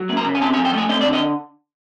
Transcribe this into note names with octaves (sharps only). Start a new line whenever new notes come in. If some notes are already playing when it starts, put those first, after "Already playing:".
Already playing: F#3
A#3
A#5
C#3
G#5
C4 A5
G#5
F3
G5
A3 G#5
C4 D#5
D5
D3
D#5